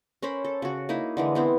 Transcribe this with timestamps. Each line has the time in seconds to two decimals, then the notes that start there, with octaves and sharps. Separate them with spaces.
0.22 C#4 A#4 C5 B5
0.45 A4
0.62 C#3 F#4
0.89 A#3 D#4 E4
1.17 D3 E3 G#3
1.35 B3 C4 E4